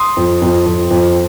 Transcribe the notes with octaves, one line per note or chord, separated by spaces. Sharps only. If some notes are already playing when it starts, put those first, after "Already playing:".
Already playing: C6 D#6
F2
F2
F2
F2